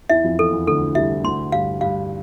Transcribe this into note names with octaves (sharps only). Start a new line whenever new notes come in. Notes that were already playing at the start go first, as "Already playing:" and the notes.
E2 E3 E5
F2 F3
E2 E3 A4
E2 E3
D2 D3 A4
C2 C3 E5
D2 D3 C6
G2 F5
G2 F5